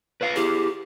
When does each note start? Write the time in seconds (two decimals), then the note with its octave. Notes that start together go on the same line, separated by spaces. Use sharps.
0.21 B4 C#5 F5
0.36 E4 G4 G#4